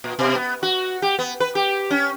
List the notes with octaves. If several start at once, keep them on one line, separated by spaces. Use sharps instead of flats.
A#2
B2
B3
F#4
G4
B3
B4
G4
C#4